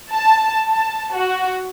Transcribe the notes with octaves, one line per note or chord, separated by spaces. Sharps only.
A5
A5
F#4